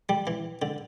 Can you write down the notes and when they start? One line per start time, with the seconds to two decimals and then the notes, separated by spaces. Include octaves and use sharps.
0.09 G3
0.27 E3
0.62 D3